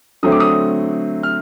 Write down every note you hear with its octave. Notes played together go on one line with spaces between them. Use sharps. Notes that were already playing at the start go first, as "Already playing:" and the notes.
D3 F#3 A3 C4 D#6
D6
D#6
F6